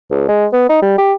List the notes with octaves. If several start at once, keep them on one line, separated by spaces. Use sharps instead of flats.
C#2
G#3
B3
D#4
G3
G4